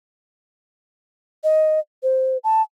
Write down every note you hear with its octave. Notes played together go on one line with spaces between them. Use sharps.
D#5
C5
A5